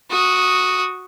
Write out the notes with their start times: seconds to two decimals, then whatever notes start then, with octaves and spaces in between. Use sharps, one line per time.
0.10 F#4 D#6